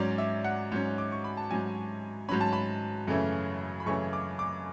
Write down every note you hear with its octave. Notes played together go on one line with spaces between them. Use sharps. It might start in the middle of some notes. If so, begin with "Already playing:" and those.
Already playing: G#2 F#3 C#4 D5
E5
F#5
G#2 F#3 C#4
D6
C#6
B5
A5
G#2 F#3 C#4 G#5
G#2 F#3 C#4 B5
A5
B5
F#2 C#3 E3 A3 C#4
B5
F#2 C#3 E3 A3 C#4 C#6
D6
D6